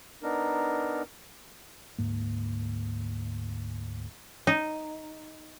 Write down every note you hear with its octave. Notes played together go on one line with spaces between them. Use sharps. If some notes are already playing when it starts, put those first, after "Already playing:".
B3 D4 D#4 A#4
D2 G#2 A#3
D#4